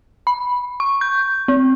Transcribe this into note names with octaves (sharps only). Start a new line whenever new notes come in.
B5
C#6
G6
C4